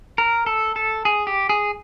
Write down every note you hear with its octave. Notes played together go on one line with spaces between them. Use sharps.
A#4
A4
A4
G#4
G4
G#4